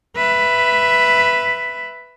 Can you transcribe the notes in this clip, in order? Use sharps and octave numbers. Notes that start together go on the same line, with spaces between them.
B4 E5